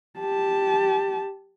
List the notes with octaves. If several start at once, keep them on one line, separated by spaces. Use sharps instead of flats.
G4 A5